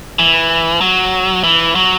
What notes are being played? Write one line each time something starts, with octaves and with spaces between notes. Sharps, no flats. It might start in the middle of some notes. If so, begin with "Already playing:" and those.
E3
F#3
E3
F#3